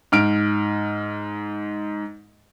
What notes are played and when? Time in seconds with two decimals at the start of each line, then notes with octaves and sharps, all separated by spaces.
0.12 G#2 F6 D7